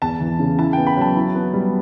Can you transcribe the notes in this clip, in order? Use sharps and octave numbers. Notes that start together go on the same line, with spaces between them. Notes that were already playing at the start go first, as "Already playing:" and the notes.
E2 A5
E3
C#3
E4 A5
B3 G5
B5
F#3 A5
E4
B3
G3